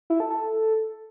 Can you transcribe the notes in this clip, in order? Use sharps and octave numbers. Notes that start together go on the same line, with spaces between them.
E4
A4
A4